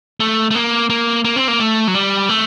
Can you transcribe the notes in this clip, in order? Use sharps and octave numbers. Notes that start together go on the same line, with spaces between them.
A3
A3
A#3
A#3
A#3
C4
A#3
A3
F#3
G3
A3